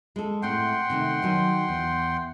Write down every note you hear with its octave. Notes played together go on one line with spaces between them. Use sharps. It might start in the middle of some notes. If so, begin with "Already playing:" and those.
G#3 A4
A2 A3 C4 F#5 G5 C6
C3 D#3 A3
D#3 F#3 G#5
E2